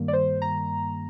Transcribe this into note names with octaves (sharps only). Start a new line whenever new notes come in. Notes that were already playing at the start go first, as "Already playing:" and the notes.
Already playing: G2 D#3 G3 A#3
D5
C5
A#5